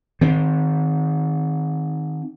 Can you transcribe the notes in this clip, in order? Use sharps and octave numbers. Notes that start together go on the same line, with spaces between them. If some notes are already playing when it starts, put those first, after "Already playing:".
D#3 C4